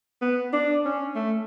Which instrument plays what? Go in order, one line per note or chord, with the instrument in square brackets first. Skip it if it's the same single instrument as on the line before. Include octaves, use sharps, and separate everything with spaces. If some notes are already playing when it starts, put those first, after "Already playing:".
[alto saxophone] B3
D4
C#4
A3